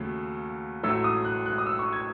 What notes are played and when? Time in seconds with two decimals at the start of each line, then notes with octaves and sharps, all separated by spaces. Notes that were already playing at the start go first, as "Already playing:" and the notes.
Already playing: D#2 C#3 F#3 A3
0.83 A1 A2 F#3 A3 E6
1.04 D#6
1.25 F#6
1.46 F#6
1.58 D#6
1.66 E6
1.79 C#6
1.93 G#6